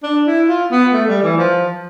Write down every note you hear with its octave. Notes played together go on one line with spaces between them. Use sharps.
D4
E4
F4
B3
A3
G3
E3
F3